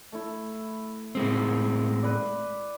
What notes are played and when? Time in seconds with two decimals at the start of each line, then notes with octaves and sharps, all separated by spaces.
0.12 A3 E4
1.15 A2 G#3 C4
2.02 B4 D5